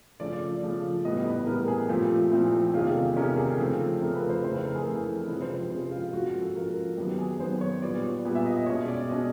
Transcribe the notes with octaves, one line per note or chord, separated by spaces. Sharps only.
C#3 F3 A3 C#4 D5
C#3 F3 A3 C#4
A2 E3 G3 B3 D#5
B4
A2 E3 G3 B3 A#4
G#4
A#2 F3 A3 C4 G4
A#2 F3 A3 C4 E4
E2 C3 D#3 G#3 C#4 F4
A4
E2 C3 D#3 G#3 C#4 A#4
G#4
C#3 F3 A3 C4 A4
C#3 F3 A3 C4 A#4
B4
C5
F2 C#3 E3 A3 C5
B4
A#4
G#4
F2 C#3 E3 A3 A4
C3 F3 G#3 C#4 B4
C5
B4
C3 F3 G#3 C#4
F4
G#2 F3 A#3 C#4 F#4
G#4
A4
G#2 F3 A#3 C#4 A#4
F#2 D#3 F#3 B3 G4
G#4
F#2 D#3 F#3 B3 C5
C#5
A#2 G3 B3 D5
A#2 G3 B3
E5
D#5
D#5
B2 G#3 C#4 C#5
D5
B2 G#3 C#4 D#5